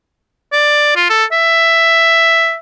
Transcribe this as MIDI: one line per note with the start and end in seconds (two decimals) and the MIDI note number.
0.52 0.94 74
0.96 1.06 65
1.09 1.25 69
1.32 2.57 76